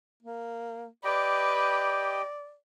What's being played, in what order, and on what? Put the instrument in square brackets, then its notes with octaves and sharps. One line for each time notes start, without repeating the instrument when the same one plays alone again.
[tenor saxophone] A#3
[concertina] G4 D#5 G5 [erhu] B4 [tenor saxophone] D5